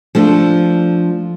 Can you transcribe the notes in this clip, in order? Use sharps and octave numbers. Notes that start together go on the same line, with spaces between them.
F3 A3 D4